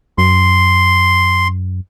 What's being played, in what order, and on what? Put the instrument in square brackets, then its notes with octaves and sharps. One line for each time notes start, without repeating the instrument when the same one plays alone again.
[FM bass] F#2 [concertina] C6